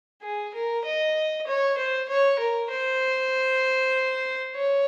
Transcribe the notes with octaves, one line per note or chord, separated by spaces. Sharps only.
G#4
A#4
D#5
C#5
C5
C#5
A#4
C5
C#5